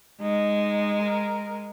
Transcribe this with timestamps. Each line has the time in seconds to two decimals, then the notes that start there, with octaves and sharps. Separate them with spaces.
0.22 G#3 D#4
1.03 A#4